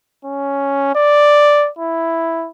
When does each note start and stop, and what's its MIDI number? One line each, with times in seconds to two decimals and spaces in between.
0.25 0.91 61
0.95 1.68 74
1.78 2.48 64